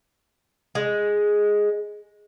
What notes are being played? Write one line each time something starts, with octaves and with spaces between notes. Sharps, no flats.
G#3